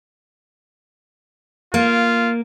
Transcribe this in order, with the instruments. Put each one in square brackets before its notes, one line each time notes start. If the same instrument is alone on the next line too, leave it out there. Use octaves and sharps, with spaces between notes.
[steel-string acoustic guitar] A#3 [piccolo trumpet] F4